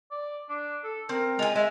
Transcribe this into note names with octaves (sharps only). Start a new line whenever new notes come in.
D5
D4
A4
C4 A#4
G#3 F4 G#5
G#3 E5